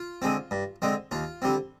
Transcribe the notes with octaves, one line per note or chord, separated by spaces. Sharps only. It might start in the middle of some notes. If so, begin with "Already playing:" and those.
Already playing: F4
D3 G#3 C4
G2
D3 G#3 C4
D#2 F4
D3 G3 C4